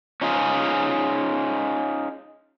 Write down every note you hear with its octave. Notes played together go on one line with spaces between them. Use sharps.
C#4 D#4 F4 G#4